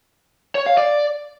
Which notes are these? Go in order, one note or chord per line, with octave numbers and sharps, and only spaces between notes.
C#5
F5
D5